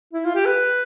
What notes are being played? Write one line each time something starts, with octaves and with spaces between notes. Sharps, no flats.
E4
F4
G4
B4